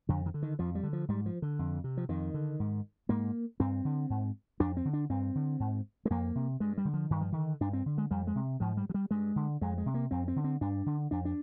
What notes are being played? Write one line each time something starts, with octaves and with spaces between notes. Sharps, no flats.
F2 D3
D#3
D3
D#3
F2 F3
G3
D3
F3
G#2 G3
F3
D3
F2
C3
F3
F2 D#3
D3
G#2
G#2 A#3
G2 C4
D3
G#2
F2 D4
C4
D3
D4
G2 C4
D3
G#2
G#3
F2 A#3
C3
G2 G#3
G3
D3
F3
G2 D#3
F3
D3 D#3
G2 D4
C4
D3
G#3
F2 G3
G#3
C3
G#2 F3
G3
F3
G3
G2 G#3
D3
F2 G#3
G#3
C3
A#3
F2 C4
C4
D3
C4
G2 D4
D3
F2 D4
D4